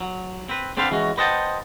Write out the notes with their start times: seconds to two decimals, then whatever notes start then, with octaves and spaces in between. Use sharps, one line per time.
0.01 F#3
0.49 C4 B4
0.77 D3 C4 A4 B4 C5 F5
0.91 E3 G#3 C#4 F#4
1.18 B4 C5 D#5 F#5 G5 A5